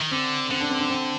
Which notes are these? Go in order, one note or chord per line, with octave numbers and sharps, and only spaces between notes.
D#3
D3 C4
D3 C4
D4
C4
D4
C4